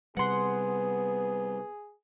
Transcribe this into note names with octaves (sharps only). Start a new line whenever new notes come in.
C3 G3 B3 G#4 F#5 C6